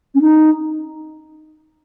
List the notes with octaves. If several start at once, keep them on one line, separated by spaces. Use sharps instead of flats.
C#4
D#4